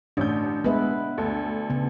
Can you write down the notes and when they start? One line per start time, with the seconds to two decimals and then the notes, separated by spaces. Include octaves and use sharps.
0.17 A1 C#4 D4 G6
0.64 G#3 B3 B4 E5
1.18 D2 A4
1.70 C#3 B3